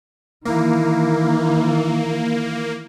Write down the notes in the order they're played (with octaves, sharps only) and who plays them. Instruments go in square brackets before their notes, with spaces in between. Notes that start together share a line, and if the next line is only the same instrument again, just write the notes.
[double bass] D#3 E3 [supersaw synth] A#3